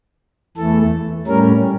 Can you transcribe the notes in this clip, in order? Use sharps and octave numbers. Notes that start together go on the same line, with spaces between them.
E2 E3 A3 A4
A2 G3 C#4 A#4